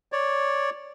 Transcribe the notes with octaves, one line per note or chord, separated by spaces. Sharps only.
C#5 D5